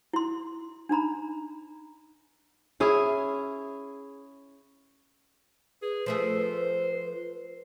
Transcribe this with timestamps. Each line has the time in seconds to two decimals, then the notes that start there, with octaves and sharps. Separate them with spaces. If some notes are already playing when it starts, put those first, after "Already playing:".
0.13 E4 C6
0.89 D4 D#4 A#5 B5
2.80 C#4 E4 G#4
5.82 G#4 B4
6.06 F3 A3 G#4 C5